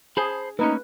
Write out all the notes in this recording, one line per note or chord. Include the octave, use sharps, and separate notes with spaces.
G#4 C5 A5 B5
A3 A#3 C#4 D#4 B4